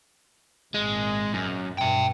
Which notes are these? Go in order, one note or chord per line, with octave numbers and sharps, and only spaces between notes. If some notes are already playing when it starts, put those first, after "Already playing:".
G#1 A#2 G#3
F#2
G2 B2 E5 G5